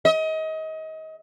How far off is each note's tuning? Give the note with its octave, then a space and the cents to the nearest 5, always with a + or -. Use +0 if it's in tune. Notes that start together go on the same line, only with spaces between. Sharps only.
D#5 +30